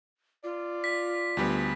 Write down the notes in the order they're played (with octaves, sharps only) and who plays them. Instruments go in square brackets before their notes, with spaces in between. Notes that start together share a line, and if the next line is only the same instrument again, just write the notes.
[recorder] F4 [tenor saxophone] D5
[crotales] B6
[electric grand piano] D2 G3 B3